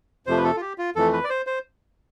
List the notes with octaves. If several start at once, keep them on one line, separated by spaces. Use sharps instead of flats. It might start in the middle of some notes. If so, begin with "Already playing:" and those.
F2 C3 F3 A3 C5
B4
A4
F4
G4
F4
F2 E3 A3 A4
B4
D5
C5
C5